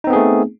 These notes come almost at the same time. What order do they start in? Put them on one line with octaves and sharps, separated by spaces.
D#4 C4 B3 G#4 A3